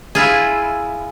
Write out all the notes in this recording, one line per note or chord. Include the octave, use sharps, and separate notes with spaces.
E4 F4 G#4